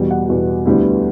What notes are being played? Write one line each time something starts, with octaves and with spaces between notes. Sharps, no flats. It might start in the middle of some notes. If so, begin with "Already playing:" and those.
Already playing: E2 B2 G3
F#5
E2 B2 G3
D2 D3 G3 B3 E4